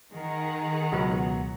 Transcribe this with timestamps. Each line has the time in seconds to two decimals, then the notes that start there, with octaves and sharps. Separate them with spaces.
0.14 D#3 G#4 F#5 A#5
0.92 C#2 B2 F#3 B3 F4